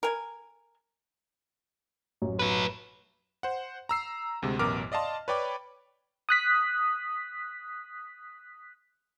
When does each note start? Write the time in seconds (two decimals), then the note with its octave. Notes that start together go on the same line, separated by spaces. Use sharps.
0.03 A#4 G#5
2.22 A1 F#2 C#5
2.39 F#3 B4
3.43 C5 F#5
3.89 A#5 E6 C7
4.42 D2 C3 G#3
4.59 A1 F#2 B2 A#4 D6 F6
4.92 D5 D#5 F5 A5 C6
5.28 B4 C#5 D5 G5 B5 D6
6.29 D#6 F#6 B6